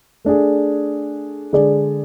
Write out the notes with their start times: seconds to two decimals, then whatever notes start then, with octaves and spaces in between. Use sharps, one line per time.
0.25 A3 D4 G#4
1.53 D3 G#3 D4 G#4 D5